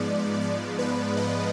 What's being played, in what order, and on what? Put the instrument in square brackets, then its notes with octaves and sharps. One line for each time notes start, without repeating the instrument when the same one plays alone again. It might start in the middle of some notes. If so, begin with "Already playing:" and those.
Already playing: [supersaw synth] G#2 F3 G#3 B3 D5
D5
B4
D#5